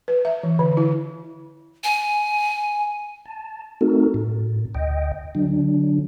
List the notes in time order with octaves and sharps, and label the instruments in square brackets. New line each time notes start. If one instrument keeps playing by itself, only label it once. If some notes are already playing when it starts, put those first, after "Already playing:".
[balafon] B4
E5
E3
D3
E4
[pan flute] G#5
[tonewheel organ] A5
A3 C4 D#4 F#4 A4 A#4
A2
D2 D#5 G5
D3 F#3 D4